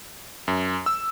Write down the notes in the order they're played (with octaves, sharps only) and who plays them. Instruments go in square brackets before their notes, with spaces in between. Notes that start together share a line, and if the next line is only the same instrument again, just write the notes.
[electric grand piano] F#2
E6